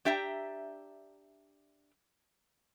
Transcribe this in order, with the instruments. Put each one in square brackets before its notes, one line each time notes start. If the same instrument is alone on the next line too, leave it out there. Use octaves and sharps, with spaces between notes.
[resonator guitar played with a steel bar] D4 G4 E5 G5 A#5